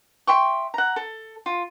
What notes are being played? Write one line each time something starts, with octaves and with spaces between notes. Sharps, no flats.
E5 G5 C6 C#6
F#5 A#5
A4
F4